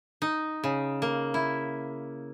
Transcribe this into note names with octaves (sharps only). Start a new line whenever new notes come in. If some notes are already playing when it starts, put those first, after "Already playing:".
D#4
C#3
A#3
E4